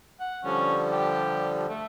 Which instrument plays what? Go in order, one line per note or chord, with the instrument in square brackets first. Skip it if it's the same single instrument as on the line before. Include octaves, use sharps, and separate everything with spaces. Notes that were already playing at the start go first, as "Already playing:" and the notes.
[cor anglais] F#5
[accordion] D3 F3 G3 [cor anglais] C#4
[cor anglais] G4
A3